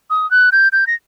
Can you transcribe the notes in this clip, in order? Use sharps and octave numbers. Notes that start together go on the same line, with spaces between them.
D#6
F#6
G6
G6
A#6